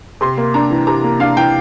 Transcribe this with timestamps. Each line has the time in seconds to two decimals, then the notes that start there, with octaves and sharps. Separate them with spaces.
0.21 C3 C6
0.37 A#3
0.54 D4 A#5
0.70 E3
0.87 C3 A#5
1.04 A#3
1.20 D4 F5
1.37 E3 G5